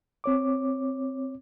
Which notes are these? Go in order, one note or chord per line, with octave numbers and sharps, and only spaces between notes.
C4 C#5 D6